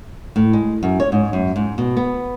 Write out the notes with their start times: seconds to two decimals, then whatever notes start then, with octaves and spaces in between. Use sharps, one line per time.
0.36 A2
0.53 G#3
0.83 F#2
1.00 C#5
1.12 G#2
1.33 F#2
1.56 G#2
1.78 B2
1.97 B3